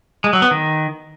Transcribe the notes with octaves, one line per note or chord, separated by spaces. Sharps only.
G#3
F#3
B3
D#3